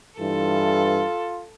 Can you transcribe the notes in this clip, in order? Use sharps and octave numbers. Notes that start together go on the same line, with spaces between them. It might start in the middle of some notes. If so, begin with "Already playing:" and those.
G2 E3 F4 A4